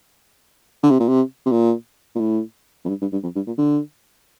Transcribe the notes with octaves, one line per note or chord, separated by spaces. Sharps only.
D3
C3
A#2
C3
C3
A#2
A#2
A2
F2
G2
G2
G2
F2
G2
A#2
D3